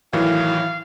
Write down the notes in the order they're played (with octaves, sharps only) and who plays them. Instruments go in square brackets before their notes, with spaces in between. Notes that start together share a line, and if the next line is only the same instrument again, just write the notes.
[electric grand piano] A2 D#3 E3 [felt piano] F#3 [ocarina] E4 [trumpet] F5